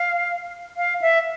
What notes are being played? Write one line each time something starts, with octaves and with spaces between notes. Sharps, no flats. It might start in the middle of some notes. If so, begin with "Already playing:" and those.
Already playing: F5
F5
E5